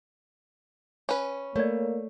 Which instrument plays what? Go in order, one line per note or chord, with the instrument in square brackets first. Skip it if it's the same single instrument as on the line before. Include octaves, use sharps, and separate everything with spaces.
[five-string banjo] C#4 B4
[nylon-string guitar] A3 [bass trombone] A#3 [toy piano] C#5 D5